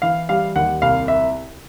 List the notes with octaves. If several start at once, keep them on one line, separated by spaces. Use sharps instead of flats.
E3 F5
G3 F5
D#2 F#5
C2 F5
E5